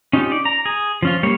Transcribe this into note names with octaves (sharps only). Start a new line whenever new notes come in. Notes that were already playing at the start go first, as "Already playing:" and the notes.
C#4 D#4 F4 G4
D5
A#5
G#4
F3 C#4 F4
G3 A#3 C#5